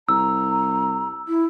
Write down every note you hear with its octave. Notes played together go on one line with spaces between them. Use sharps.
C2 A#5 E6
E4